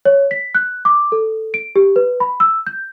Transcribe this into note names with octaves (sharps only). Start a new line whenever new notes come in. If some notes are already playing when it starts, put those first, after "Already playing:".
C#5
B6
F#6
D6
A4
D7
G4
B4
B5
E6
G6